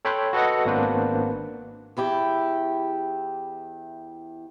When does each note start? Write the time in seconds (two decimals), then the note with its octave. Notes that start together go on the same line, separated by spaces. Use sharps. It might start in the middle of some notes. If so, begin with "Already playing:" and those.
0.05 A4 C#5 G5 B5 C6 F#6
0.33 F#4 A4 B4 D#5 F#5
0.65 G#1 A#3 B3 D4 B4 C5
1.97 E2 E4 G4